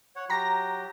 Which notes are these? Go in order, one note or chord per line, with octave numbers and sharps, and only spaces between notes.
C#5 F#5
F#3 G4 A#5 A#6